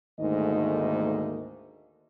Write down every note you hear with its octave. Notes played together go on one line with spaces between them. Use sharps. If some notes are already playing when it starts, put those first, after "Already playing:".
D2 G#2 D#3 A3 A#3 D#5